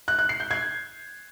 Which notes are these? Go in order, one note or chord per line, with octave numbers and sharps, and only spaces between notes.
F#6
F#6
C7
G6
G#6